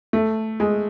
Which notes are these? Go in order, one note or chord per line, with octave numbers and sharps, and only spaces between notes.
A3
G#3